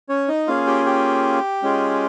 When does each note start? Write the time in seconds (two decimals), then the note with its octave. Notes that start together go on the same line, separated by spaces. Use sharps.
0.09 C#4 C#5
0.28 D#4 D#5
0.47 A#3 C#4 F4 G#4 F5
0.67 G4 G5
0.86 G4 G5
1.63 G#3 C#4 F4 G#4